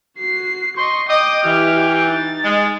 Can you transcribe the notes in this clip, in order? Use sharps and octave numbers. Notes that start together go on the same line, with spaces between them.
F#4 C7
D#5 C6 C#6
D#5 G5 D6 D#6
E3 G4 F6
D#4 A6
G#3